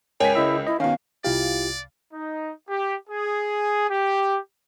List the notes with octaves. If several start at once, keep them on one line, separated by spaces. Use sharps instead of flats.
C#2 A#4 C#5 G5 G#5 B6
C#3 E4 D#5 E6
E4 D#5
B2 D#3 C#4 F5
C2 E4 F4 G4 D5 F5
D#4
G4
G#4
G4